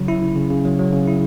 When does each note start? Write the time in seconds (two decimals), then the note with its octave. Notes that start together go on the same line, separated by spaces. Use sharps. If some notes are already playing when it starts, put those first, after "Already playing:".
Already playing: C#3 F#3
0.08 E4
0.23 C#3
0.36 C#3
0.50 C#3
0.65 F#3
0.79 F#3
0.93 C#3
1.07 E4